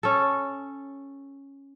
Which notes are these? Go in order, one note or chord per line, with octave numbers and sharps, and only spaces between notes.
C#4 A4